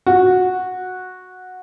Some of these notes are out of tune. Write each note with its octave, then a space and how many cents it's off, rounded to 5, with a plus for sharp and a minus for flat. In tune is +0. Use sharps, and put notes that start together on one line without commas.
F#4 -10